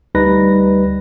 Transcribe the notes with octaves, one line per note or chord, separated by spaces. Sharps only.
D2 G3 D#4 B4 A#6